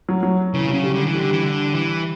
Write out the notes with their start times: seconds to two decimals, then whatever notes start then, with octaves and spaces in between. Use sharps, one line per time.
0.09 F#3
0.23 F#3
0.53 C#3 E3
0.68 C#3 F#3
0.83 G3
0.93 D3
1.05 E3
1.14 D3 G3
1.30 E3
1.44 D3
1.74 E3